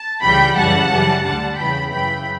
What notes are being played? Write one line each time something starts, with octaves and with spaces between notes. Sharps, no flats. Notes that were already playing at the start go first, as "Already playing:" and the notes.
Already playing: A5
C#2 C#3 E3 G3 G5 B5
F#2 C#3 E3 G3 F#5 A5
F#2 E3 G3
D2 D3 G3 F#5 A5
E2 C#3 E3 G5 B5
F#2 C#3 E3 G5 B5